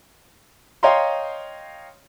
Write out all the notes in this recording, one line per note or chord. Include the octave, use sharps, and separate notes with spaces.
C#5 D#5 F5 G5 A#5 C6